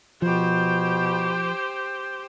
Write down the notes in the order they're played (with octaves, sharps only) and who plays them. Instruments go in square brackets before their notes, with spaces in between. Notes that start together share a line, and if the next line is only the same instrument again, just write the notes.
[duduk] B2 [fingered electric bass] F3 [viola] G4 C5